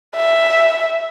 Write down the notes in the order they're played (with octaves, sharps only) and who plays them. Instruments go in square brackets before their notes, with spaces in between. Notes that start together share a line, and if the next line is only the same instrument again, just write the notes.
[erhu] E5